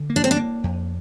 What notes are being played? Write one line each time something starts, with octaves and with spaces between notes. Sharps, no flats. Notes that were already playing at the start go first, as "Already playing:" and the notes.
Already playing: D3
A#3
D4
C4
D4
A#3
F2